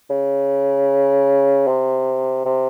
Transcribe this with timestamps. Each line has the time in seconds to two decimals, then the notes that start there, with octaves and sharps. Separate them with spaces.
0.10 C#3
1.67 C3
2.45 C3